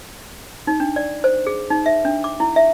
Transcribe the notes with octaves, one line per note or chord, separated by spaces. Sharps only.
D#4
D4
D5
C5
G#4
D#4
E5
D4
D6
E4
E5